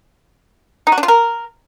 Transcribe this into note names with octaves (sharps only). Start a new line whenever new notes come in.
D#4
F#4
D4
F4
A#4